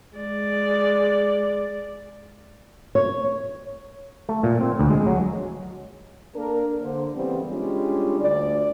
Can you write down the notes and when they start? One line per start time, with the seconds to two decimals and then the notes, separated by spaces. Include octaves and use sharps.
0.17 G#3 D5
2.95 C#5
4.29 A3
4.43 A#2
4.61 C4
4.79 D2
4.90 G#3
5.07 F#3
6.35 A#3 D4 A4 A#4
6.81 D3 A#3 C5
7.15 C#3 E3 G3 B3 C4
7.48 G3 G#3 C#4 D4 F4
8.20 D2 D5